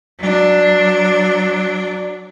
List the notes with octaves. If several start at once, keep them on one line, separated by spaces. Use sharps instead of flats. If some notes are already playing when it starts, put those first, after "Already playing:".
F#3 D4